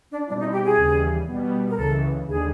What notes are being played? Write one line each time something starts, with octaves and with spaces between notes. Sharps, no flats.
D4
B2 G3 C4 D4 E4
D#4
G4
G#4
D#2 C#3 E3 G3
B2 G3 B3
A#4
C#2 C#3 E3 A4
D#2 D3 G3 G#4